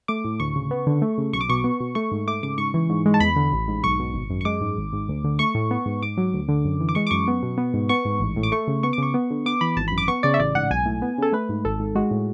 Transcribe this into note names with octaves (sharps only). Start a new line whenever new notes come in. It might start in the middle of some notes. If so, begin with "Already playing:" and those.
A3 D6
A2
D2 C#6
C#3
B3
D3
A3
C#3
B1 C#6
D6
B2 C#6
B3
B2
A3 C#6
G#2
A3 D6
C#3 D6
G#2 C#6
E3
G#2
G#3
A5
E2 B5
D3
A1
G#2
B1 C#6
B2
G#1
F#2
C#6
G#3 D6
G#2
G#1
G#2
D2
D3
A3 C#6
A2
B3
G#2
G#2 D6
F#3
D2
D3
F#2
E3
D6
G#3 C#6
D6
F#2 C#6
B3
B2
B3
G#2
B3 C#6
G#2
A1
A2
D6
A3 C#6
C#3
B3 C#6
D6
C#3 C#6
B3
D3
B3 D6
E3 B5
G#1 A5
F#2 B5
D6
B3 C#6
C#3 D5
E5
A1 D5
G#2 F#5
B1 G#5
A2
B3
C#3 A4
A3 B4
G#2
G#1 A4
G#2
G#3 F#4
A2